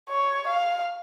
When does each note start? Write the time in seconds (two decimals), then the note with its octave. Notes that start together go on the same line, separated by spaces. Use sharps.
0.09 C#5
0.48 F5